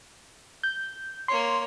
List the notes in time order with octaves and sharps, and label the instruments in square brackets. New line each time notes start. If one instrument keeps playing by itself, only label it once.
[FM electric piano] G6
[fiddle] A#3 C#5 [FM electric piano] C6